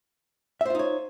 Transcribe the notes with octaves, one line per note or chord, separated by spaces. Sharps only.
D#4 F4 C5 C#5 E5